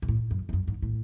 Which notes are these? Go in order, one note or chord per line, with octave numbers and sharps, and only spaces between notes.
B2
A2
F#2
E2
F#2
G#2
A2